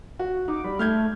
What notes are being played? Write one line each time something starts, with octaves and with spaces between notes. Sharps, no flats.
F#4
D#4 D6
G3 B5
A3 F6 G6 G#6